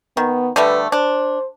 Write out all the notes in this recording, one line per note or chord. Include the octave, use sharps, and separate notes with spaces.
D#3 B3
D3 G3 A3 B4
D4 C5